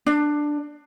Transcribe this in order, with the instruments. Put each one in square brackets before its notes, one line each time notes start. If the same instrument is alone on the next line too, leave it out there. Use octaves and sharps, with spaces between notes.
[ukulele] D4